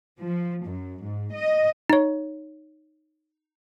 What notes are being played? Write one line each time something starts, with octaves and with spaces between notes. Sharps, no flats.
F3
F#2
G#2
D#5
D#4 C#5